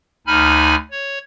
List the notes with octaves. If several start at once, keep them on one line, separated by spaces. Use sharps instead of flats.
D2 D#4 G#5 B5 F6
C#5